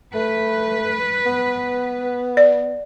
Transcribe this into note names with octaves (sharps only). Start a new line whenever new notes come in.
A3 B4
B3
D5